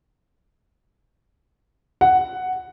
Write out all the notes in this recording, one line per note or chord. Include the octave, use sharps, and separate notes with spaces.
F#5